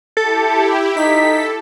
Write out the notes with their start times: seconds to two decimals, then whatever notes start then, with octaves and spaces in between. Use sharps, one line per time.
0.17 E4 G4 A4
0.97 D#4 A4 B6